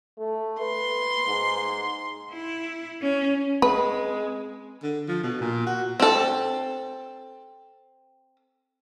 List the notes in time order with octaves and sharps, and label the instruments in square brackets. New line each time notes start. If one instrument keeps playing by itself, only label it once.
[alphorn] A3
[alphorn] B4 [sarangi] C6
[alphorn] G#2
[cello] E4
C#4
[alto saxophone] G#3 [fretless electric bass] C4 [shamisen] B4
[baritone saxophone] D3
F3
B2
A#2
F#4
[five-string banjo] C4 A4